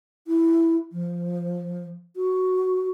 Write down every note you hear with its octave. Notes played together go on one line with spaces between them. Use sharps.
E4
F3
F#4